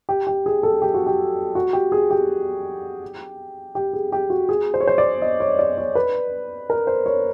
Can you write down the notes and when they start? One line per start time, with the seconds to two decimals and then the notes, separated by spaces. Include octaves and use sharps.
0.09 G4
0.27 G4
0.46 G#4
0.63 A4
0.82 G4
0.94 F#4
1.07 G4
1.55 F#4
1.73 G4
1.92 G#4
2.10 G4
3.75 G4
3.93 G#4
4.12 G4
4.30 F#4
4.49 G#4
4.74 C5
4.80 C#5
4.87 C5
4.98 D5
5.22 D#5
5.40 C#5
5.59 D5
5.78 C#5
5.95 B4
6.70 A#4
6.87 C5
7.06 C#5